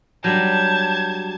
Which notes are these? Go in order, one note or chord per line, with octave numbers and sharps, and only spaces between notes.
F#3 G3 D4 A5 G6 G#6